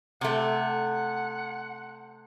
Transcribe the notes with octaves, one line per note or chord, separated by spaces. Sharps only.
C3 A3 F#5